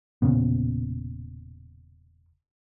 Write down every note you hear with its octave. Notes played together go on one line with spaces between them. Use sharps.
E1 A#2 C#3 B3